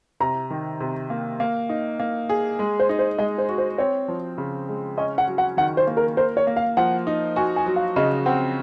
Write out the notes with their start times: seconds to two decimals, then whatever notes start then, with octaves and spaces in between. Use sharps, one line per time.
0.20 C3 A#5
0.50 D#3
0.80 C3
1.10 A#3
1.40 A#3
1.69 D#4
2.00 A#3
2.29 G#4
2.59 G#3
2.80 C5
2.89 D#4
2.99 C5
3.18 G#3 D#5
3.38 C5
3.49 F#4
3.58 C5
3.78 C4 C#5
4.08 F3
4.38 C#3
4.68 G#3
4.98 C#4 D#5
5.18 F#5
5.27 F#3
5.38 F#5
5.57 D#3 F#5
5.77 C5
5.87 A#3
5.97 A#4
6.17 A#4 C5
6.37 C#5
6.47 A#3
6.56 F5
6.77 F3 F#5
7.07 D#4
7.36 F#4 G#5
7.56 G#5
7.66 F#3
7.76 F5
7.96 C#3 D#5
8.26 C4 F#5